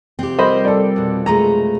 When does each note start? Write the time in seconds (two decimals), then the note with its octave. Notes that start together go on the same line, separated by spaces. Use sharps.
0.19 F1 C4 G4
0.39 G3 A#4 C5 D#5 B5
0.65 A4 D5
0.96 F2 B2
1.26 G#3 A3 B4 A#5